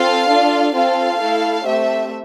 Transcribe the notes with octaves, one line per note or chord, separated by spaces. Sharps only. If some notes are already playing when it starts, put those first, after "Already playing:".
Already playing: C4 F4 A4 F5
D4 F4 A4
C4 F4 A4 F5
A3 E4 A4
A3 C4 G4 E5